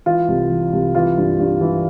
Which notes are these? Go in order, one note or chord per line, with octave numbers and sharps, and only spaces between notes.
E3 F4
C2
E3
C2
E3 F4
G2
G2
E3